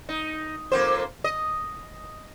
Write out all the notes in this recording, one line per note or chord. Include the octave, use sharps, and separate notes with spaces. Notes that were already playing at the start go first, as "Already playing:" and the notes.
D#4
F2 A#3 C5
D#5